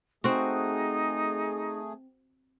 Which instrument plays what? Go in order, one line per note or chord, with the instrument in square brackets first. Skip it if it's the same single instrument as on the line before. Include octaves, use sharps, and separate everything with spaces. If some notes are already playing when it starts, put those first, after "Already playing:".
[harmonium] A3 G#4 [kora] C4 F#4 [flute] D#4